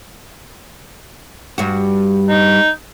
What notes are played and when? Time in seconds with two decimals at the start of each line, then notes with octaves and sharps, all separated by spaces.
1.58 G2 F#4
2.29 D#4